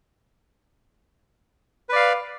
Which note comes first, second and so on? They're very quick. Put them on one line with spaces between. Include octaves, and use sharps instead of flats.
B4 D5 F5